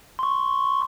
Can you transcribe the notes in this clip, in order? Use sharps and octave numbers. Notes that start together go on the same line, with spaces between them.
C6 C#6